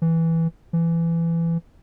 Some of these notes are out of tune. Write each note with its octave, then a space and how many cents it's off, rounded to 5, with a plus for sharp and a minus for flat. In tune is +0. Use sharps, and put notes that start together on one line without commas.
E3 -5
E3 +20